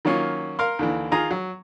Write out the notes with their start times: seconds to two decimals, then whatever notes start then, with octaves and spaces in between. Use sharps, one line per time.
0.05 D#3 F#3 A#3 C#4 F4
0.59 A#4 F5 C6
0.79 D#2 D3 E3
1.12 D#3 F4 G#4 A#5 D#6
1.31 F#3